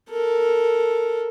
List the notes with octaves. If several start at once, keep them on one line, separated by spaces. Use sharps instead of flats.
A4 A#4